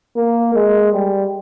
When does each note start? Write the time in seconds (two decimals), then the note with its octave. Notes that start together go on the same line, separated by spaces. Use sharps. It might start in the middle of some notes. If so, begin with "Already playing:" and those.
0.17 A#3
0.54 G#3
0.93 G3